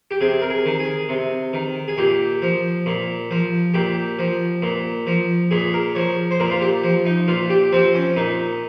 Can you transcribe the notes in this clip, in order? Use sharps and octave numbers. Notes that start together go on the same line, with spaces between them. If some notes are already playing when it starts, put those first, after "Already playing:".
G4
C3 G#4
A#4
G#4
D#3
G#4
C3
D#3
G#4
A#2 G4
F3
A#2
F3
A#2 G4
F3
A#2
F3
A#2 G#4
A#4
F3 C#5
C5
A#2 A#4
F4
G4
F3
D#4
A#2 F4
G4
F3 C4
C#4
A#2 D#4